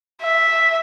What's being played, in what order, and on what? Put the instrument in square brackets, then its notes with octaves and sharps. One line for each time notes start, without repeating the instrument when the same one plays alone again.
[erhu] E5